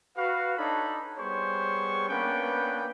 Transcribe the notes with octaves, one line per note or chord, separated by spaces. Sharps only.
F#4 B4 F5
D4 D#4 A4 C#5 A5 B5
G3 B3 G#4 C5 C#5 C#6
A#3 B3 C#4 D4 B4 G5